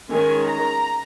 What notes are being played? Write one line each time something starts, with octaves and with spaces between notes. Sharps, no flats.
D#3 G#3 C#4 G#5
A#5